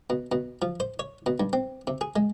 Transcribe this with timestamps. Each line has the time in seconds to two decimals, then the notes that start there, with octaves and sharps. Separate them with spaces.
0.10 B2
0.32 B2
0.62 F3
0.80 C5
0.99 C#5
1.26 B2
1.40 G2
1.53 C4
1.87 C3
2.01 G#4
2.16 G#3